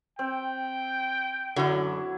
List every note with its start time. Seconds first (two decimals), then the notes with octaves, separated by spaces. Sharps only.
0.19 C4 G5
1.56 F#2 D3 F#3 E4